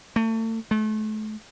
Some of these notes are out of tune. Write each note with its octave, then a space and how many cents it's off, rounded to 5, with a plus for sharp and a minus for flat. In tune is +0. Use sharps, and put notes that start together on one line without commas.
A3 +35
A3 -35